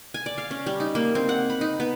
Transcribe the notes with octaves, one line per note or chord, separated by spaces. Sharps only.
G#5
D5
F5
C#4
G3
D#4
A#3
C4
F#5
B5
D#4
B3